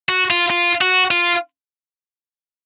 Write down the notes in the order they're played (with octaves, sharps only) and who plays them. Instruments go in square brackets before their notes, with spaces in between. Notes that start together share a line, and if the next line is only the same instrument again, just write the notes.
[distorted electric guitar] F#4
F4
F4
F#4
F4